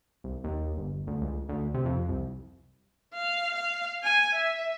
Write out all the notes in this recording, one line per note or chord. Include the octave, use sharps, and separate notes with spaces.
C2
D#2
G1
D2
C#2
D2
C3
F2
C2
F5
F5
G#5
E5